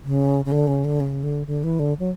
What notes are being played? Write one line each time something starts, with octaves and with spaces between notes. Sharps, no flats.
C#3
C#3
D3
C#3
D3
C#3
D3
D3
E3
D3
F#3